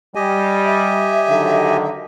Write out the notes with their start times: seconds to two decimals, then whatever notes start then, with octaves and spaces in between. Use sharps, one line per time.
0.15 G3 G4 D#5 G#5
0.66 E5
1.28 D3 D#3 F#3